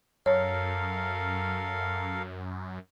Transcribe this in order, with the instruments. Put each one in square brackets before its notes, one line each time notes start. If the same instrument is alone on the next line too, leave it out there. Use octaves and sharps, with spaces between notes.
[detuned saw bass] F#2 [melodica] A4 A#4 F5 [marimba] C#5